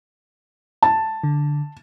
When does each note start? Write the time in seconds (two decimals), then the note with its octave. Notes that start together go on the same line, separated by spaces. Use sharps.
0.82 A5
1.23 D3